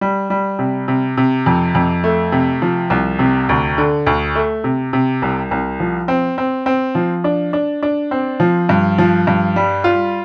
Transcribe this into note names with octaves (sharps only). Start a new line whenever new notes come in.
G3
G3
C3
C3
C3
F2
F2
A3
C3
F3
C2
C3
D2
D3
D2
A3
C3
C3
C2
C2
F3
C4
C4
C4
F3
D4
D4
D4
C4
F3
G2
F3
G2
G3
F4